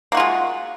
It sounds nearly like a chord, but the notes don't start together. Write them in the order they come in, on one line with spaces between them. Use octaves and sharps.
A#3 F#4 F4 G#3